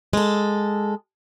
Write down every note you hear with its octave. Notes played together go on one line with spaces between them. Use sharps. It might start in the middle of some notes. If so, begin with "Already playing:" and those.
G#3 A4